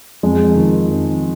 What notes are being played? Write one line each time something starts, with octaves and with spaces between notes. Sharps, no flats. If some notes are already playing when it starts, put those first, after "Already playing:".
F2 G#3
D#3
F2